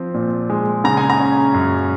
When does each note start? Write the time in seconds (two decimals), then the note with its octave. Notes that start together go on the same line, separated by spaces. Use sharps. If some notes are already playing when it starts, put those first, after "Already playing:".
Already playing: F3 C4
0.14 A#2
0.50 G#3
0.84 C#3 A#5
0.97 G#5
1.10 A#5
1.20 C#4
1.54 F#2